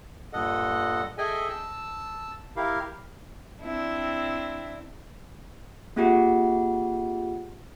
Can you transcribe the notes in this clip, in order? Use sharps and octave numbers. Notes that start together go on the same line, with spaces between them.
G2 A#2 A4 D#5 F#5
G#4 A4 D#5 E5 G5 G#5
A5 E6
E4 G4 A#4 F5
C4 D4 E4
A#3 C4 F4 G4 G#4 F#5